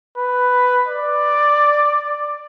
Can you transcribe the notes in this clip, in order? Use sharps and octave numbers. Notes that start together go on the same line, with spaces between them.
B4
D5